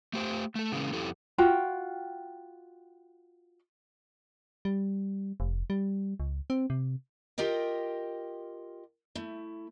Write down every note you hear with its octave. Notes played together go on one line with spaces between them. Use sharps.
A3 G4 C5
A3 A4
C#3 E3 G#3 A#3 C#4
F2 E4 G4 A4
F4 F#4 G5
G3
F1
G3
C#2
C4
C3
F4 G4 A#4 D#5 G5
A3 E4